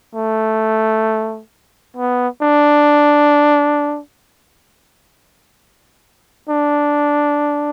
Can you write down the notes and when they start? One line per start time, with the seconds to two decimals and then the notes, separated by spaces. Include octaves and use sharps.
0.15 A3
1.96 B3
2.42 D4
6.49 D4